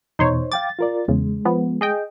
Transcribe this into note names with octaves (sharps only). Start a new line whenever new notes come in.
E2 B2 D#4 C5 C#5
F5 G5 D6 A6
F4 A#4 D5
E2 C#3 G#3
F3 B3
G#4 D#5 G5